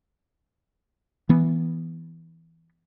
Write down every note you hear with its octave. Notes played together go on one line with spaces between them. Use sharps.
E3 B3